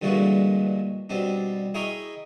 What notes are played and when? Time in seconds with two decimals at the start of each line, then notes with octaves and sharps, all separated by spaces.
0.02 G2 A#2 D3 E3 G#3 F#4
1.10 B2 G3 C4 D4
1.74 E4 G#4 A#4 D#5 G5 C#6